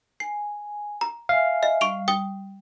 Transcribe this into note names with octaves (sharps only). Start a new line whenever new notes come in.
G#5 C7
A#5
E5 F5 G#5
D#5
G3 C#6 D7 F7
G5 D#6 G7